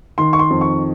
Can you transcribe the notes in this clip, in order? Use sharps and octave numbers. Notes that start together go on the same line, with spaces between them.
D#3 C6
C#6
C6
F2
C#6